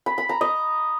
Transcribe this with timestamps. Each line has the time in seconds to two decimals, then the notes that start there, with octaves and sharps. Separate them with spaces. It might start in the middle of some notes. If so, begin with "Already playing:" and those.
0.06 B5
0.18 B5
0.29 A#5
0.41 D#5